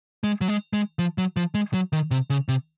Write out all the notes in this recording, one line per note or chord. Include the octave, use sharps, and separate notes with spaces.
G#3
F#3
G#3
G#3
F3
F#3
F3
G#3
F#3
D#3
C3
C#3
C3